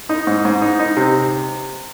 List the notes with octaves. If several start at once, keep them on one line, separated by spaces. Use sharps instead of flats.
D#4
G#2
G#2
D#4
D#4
C3